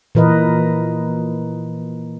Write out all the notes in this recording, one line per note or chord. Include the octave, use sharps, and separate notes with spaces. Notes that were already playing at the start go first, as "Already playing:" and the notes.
A#2 E3 A#4 B4 D#5